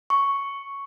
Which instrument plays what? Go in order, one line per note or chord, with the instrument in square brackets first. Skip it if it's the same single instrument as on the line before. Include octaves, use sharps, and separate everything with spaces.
[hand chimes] C#6